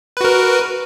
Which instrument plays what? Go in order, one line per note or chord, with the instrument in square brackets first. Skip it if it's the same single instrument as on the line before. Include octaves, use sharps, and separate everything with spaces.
[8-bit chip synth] B4
F#4
A#4